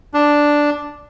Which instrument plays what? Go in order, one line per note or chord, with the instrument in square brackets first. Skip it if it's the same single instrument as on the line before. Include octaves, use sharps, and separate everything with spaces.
[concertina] D4